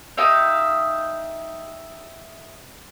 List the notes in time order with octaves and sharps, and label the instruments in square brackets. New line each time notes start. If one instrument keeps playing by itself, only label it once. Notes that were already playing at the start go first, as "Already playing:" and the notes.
[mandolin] D#4 G4 E5 F5